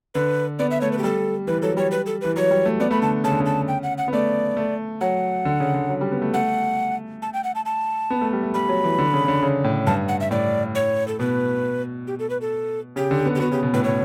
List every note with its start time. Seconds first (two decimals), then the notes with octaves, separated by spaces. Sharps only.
0.14 D3 B4
0.59 B3 D5
0.71 E5
0.81 A3 C#5
0.92 B4
0.98 G4
1.04 G3 A4
1.47 E3 B4
1.62 F#3 A4
1.77 G3 C#5
1.91 B4
2.06 A4
2.21 E3 B4
2.36 F#3 C#5
2.51 G3
2.66 A3
2.80 B3 D5
2.91 A3 B5
3.02 D3 A5
3.24 C#3 A5
3.32 D3
3.40 C#3
3.46 A5
3.68 G5
3.83 F#5
3.98 F#5
4.08 B3
4.13 A3 D5
4.57 A3
5.01 F#3 F#5
5.45 D3
5.60 C#3
5.74 D3
5.89 F#3
6.01 G3
6.12 B3
6.22 A3
6.33 A3 F#5
7.22 A5
7.33 G5
7.44 F#5
7.55 A5
7.66 A5
8.10 B3
8.21 A3
8.33 G3
8.43 A3
8.54 G3 B5
8.69 F#3
8.84 E3
8.98 D3
9.13 C#3
9.24 C#3
9.28 D3
9.42 C#3
9.64 A2
9.87 G2 A5
10.08 F#5
10.20 E5
10.31 A2 D5
10.75 C#5
11.08 A4
11.19 B2 B4
12.07 G4
12.19 A4
12.30 B4
12.41 A4
12.96 C#3 G4
13.11 D3
13.26 B3
13.35 G4
13.40 B3 F#4
13.51 C#3 G4
13.63 B2
13.73 A2 B4
13.84 B2 C#5